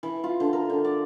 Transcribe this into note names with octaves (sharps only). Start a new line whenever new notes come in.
E3
F4
D3
A#4
D3
D5